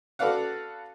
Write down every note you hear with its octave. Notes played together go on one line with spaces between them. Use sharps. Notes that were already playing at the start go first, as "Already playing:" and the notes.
F#4 A4 B4 D5 F5 F#5